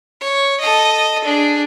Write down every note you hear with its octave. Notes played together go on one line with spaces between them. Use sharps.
C#5
A4 D#5
D4 G#4